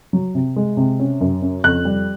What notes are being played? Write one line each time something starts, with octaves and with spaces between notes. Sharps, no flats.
F#3
C3
G#3
C3
C#4
F#2
C#4
F2 F#6
G3